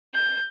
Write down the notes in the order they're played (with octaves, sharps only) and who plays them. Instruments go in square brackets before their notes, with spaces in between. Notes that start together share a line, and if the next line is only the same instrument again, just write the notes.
[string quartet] G6